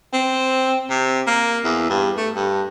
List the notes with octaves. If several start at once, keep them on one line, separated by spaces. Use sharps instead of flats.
C4
C3
A#3
E2
G2
A3
G2